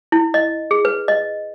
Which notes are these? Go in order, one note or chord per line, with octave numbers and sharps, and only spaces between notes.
E4
D#5
G#4
B4
D#5